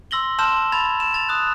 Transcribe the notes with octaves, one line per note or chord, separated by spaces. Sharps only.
C6 E6 A#6 F#7 G7
A5 C6 E6 F6 G6 E7
B5 G#6 A6 F7
E7
A6 F7
D#6 F#6